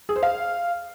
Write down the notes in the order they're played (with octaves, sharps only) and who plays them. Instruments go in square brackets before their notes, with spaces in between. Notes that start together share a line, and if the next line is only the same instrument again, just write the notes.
[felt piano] G#4
C5
F5